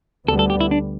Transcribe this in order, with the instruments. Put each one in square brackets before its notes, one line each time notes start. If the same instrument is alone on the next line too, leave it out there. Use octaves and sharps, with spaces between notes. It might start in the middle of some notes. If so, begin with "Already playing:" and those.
[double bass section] D2 D3 G3 B3 [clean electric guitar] A4
[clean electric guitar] A4
G4
E4
D4